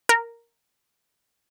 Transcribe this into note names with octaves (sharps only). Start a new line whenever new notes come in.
A#4